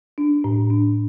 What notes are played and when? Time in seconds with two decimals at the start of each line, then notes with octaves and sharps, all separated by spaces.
0.18 D4
0.44 A2
0.70 D4